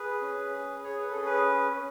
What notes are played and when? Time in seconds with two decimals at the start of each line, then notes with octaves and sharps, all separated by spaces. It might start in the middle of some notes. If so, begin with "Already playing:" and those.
Already playing: G#4 B4
0.22 C#4
0.53 G#4
0.84 G#4 C#5
0.99 B4
1.11 C#4 A4
1.26 B4